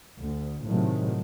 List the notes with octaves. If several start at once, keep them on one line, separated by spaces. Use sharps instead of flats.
D2
A2 C3 D#3 F#3 G#3 A3